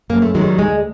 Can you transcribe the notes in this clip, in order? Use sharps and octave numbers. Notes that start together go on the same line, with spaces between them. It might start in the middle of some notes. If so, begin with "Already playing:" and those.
F#2 A#3
A3
D#3 F#3 G#3
G3
D2 G#3